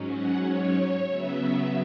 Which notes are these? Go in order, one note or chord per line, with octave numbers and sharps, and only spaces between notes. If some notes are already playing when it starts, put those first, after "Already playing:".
Already playing: G#2 F#3 C#4
F#5
C#5
C#3 F#3 B3 E5